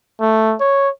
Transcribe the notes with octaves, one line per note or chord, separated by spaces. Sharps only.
A3
C#5